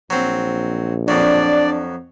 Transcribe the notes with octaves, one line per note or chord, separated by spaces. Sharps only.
A#1 F#3 C4
F2 F#3 D4 D5